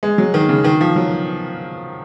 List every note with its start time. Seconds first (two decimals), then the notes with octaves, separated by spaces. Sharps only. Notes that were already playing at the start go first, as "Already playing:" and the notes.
0.03 G#3
0.18 F#3
0.34 D#3
0.49 C#3
0.64 D#3
0.81 F3
0.96 F#3